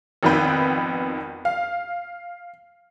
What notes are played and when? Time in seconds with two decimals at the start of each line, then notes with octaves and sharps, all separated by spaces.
0.23 G#1 F2 D#3 B3 B4 G5
1.45 F5